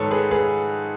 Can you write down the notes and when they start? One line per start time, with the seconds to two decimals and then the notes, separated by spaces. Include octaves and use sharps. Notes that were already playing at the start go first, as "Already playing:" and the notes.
Already playing: G#2 D#3 A4 B4 C#5
0.11 G#4 B4
0.31 G#4 B4